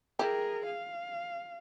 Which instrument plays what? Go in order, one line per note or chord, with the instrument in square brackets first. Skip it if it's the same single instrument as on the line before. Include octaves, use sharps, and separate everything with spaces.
[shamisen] E4 G4 [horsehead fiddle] G#4 A#4
[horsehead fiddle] F5